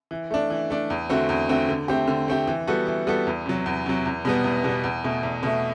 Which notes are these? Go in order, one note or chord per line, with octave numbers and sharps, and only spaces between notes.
E3
A3 D4
E3
A3 D4
E2
D3 A3 C4 F#4
E2
D3 A3 C4 F#4
D3
A3 C4 G4
D3
A3 C4 G4
E3
G3 B3 F#4 A4
E3
G3 B3 F#4 A4
E2
C3 F#3
E2
C3 F#3
E2
B2 G3 B3
E2
B2 G3 B3
E2
B2 A3
E2
B2 A3